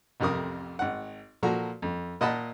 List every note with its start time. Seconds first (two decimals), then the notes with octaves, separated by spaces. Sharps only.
0.20 A1 F2 C3 A#4 D#6
0.79 G#1 F#5
1.43 A#2 F3 F#4 A4 A#5
1.82 F2
2.21 A#2 D#5 F#5 A5 B5